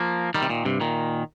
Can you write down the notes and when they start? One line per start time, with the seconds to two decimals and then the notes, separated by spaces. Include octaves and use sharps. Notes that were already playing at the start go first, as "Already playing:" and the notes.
Already playing: F3 A#3
0.34 D#3 G3
0.42 C3
0.50 A#2 D#3
0.65 G2 C3
0.80 A#2 D#3